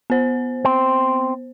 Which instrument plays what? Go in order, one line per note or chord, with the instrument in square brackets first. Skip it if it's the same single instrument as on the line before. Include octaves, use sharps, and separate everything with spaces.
[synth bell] B3 C5
[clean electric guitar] C4